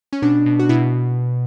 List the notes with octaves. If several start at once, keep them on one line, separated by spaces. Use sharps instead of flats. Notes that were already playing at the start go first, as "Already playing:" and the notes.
C#4
B2 D4
B2
F#4
B2 E4